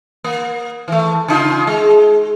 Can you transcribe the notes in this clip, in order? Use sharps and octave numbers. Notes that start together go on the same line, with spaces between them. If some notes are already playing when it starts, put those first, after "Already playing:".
A#3
E3 A3
C#3 D#4 F4
G#3